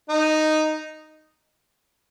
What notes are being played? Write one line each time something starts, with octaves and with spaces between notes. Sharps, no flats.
D#4